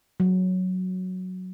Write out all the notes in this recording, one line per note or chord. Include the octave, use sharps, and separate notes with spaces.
F#3